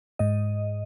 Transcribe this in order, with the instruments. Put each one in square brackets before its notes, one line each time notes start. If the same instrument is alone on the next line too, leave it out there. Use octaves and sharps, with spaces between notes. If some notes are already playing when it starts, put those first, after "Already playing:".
[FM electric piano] G#2 D#5